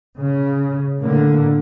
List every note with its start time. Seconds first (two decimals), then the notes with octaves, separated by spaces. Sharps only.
0.17 C#3
1.01 A2 D3 A#3